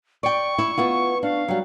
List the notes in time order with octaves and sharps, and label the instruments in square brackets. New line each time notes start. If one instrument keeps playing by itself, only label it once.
[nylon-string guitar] D5 G5 [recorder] C#6
[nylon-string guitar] E4
B3 E4 F4
[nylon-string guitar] D4 [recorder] F5
[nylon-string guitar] F#3 G3